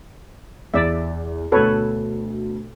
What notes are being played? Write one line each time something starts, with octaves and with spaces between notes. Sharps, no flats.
E2 D5 E5
D2 B2 A4 B4 C#5